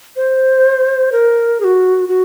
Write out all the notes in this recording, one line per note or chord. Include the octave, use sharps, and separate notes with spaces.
C5
A#4
G#4
F#4
F#4